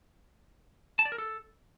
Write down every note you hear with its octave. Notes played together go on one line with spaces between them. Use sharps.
A5
D5
A#4
A4